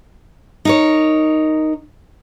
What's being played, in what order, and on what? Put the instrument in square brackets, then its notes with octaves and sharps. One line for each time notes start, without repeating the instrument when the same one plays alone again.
[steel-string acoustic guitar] D#4 A#4 C#5